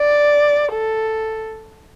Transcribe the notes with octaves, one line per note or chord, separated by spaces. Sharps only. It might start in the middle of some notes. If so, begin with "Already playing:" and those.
Already playing: D5
A4